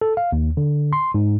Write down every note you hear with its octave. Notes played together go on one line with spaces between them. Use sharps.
A4
F5
D#2
D3
C6
G#2